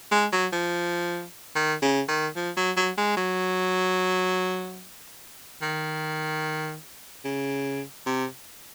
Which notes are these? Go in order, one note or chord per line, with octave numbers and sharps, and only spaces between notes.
G#3
F#3
F3
D#3
C#3
D#3
F3
F#3
F#3
G#3
F#3
D#3
C#3
C3